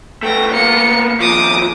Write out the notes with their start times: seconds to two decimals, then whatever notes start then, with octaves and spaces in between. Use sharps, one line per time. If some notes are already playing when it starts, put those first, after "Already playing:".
0.23 A3 B3 G5 A#6
0.52 A#3 B3 F4 C#7
1.20 D#2 F3 D6 D#6